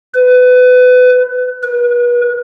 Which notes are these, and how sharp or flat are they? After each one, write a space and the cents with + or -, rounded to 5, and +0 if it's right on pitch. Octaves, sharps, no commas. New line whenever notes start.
B4 +25
B4 -35